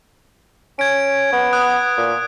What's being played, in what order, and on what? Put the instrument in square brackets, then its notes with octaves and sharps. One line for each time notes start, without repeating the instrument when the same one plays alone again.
[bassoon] C#4 [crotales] G#6 D7
[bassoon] B3
[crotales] D#6 F#6
[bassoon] A#2